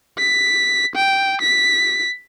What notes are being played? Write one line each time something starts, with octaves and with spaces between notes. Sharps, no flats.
B6
G5
B6